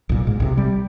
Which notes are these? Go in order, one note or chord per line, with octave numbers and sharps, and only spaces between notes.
B1 A#2
G#2
B1 C3
G3